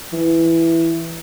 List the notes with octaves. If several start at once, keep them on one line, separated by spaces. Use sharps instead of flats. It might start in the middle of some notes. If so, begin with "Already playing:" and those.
E3